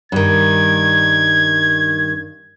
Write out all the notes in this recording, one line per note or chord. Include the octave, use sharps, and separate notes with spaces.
G2 D#3 G#6